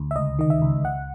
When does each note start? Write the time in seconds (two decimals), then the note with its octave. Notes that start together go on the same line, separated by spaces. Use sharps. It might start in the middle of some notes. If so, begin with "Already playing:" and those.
Already playing: D2
0.11 E5
0.16 C#2 D#5
0.39 D#3 D#5
0.50 E5
0.62 C#2
0.84 C#2 F#5